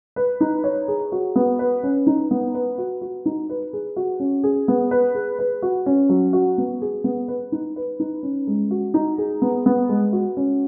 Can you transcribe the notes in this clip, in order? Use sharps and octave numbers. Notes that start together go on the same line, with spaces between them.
B4
D#4
C#5
G#4
F#4
B3
B4
C#4
D#4
B3
B4
F#4
F#4
D#4
B4
G#4
F#4
C#4
G#4
B3
B4
G#4
B4
F#4
C#4
F#3
F#4
B3
G#4
B3
B4
D#4
B4
D#4
C#4
G#3
F#4
D#4
G#4
B3
B3
G#3
F#4
C#4